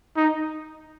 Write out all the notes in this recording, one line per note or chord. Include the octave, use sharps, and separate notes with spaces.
D#4